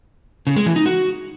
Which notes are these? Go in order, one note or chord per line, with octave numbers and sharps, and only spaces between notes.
C#3
G#3
E3
D#4
F#4